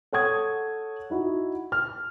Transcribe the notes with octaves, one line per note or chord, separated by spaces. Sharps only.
A4 C#5 F#5 C#6 D#6 G#6
D#4 E4 F#4
F6